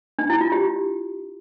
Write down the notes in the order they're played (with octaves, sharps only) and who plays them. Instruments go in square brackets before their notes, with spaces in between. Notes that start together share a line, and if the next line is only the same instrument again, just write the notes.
[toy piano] D4
E4
F4
G4